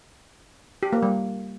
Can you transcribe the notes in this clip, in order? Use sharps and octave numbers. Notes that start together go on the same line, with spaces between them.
G4
A#3
G3